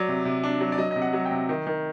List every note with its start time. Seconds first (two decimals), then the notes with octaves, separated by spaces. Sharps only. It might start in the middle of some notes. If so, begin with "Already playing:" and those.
Already playing: F#3 D5
0.08 C3
0.25 C3
0.44 D4
0.61 F#3
0.72 D5
0.78 F#3 D#5
0.91 C3 D#5
1.02 F#5
1.13 F#3
1.25 G5
1.31 C3
1.49 D#3
1.67 D#3